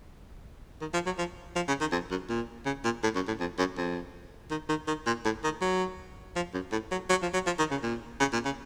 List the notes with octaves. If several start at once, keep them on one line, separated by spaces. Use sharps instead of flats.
D#3
F3
F#3
F3
F3
C#3
D#3
F2
F#2
A#2
C#3
A#2
A2
F#2
A2
F2
F#2
F2
D#3
D#3
D#3
A#2
A2
D#3
F#3
F3
F#2
A2
F#3
F#3
F3
F#3
F3
D#3
C#3
A#2
C#3
A#2
C#3